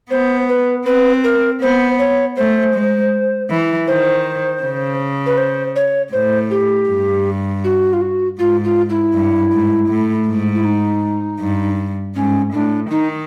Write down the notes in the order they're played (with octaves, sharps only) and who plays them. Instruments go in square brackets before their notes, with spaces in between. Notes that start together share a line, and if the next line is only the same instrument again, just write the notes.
[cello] B3 [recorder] C5
[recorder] B4
[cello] C4 [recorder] B4
[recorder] A#4
[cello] B3 [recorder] C5
[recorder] C#5
[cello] A3 [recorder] C5
[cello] G#3
E3
[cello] D#3 [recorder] C5
[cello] C#3
[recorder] B4
C5
C#5
[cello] A2 [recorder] C5
[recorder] G4
[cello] G2
[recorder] F#4
F4
F#4
[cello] G#2 [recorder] F4
[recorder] F4
E4
[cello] G2
G#2
A2
G#2
[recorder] E4
D#4
[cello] G2
[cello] G#2 [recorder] C#4
[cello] A2 [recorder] D4
[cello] D#3 [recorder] D#4